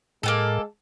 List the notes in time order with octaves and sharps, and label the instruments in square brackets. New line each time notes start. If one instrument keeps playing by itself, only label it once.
[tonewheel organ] A2 [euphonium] G#3 [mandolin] A#3 B3 A4